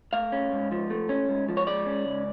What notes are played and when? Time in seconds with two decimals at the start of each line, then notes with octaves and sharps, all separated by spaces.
0.13 A3 F5
0.32 C#4
0.52 G#2
0.72 F3
0.90 A3
1.09 C#4
1.29 G#2
1.49 F3
1.57 C#5
1.67 G#3 D5
1.86 C#4
2.06 C#2